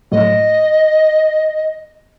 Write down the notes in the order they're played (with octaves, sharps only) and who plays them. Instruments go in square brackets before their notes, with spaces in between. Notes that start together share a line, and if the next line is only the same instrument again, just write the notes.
[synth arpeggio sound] A2 F#3 [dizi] D#5